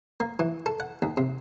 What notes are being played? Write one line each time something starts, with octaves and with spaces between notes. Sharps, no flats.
A#3
E3
A4
F#5
D#2
C3